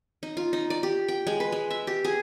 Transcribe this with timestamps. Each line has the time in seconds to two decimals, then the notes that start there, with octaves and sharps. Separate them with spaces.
0.23 D#4
0.37 F4
0.53 D#4
0.70 D5
0.83 G4
1.08 G5
1.27 G#3
1.40 B4
1.52 G#3
1.70 E5
1.87 G4
2.04 G#4